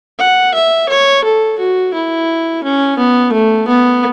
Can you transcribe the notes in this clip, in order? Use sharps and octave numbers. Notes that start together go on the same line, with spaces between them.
F#5
E5
C#5
A4
F#4
E4
C#4
B3
A3
B3